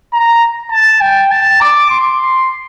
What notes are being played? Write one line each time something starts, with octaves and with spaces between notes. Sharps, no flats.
A#5
A5
G5
A5
D6
C6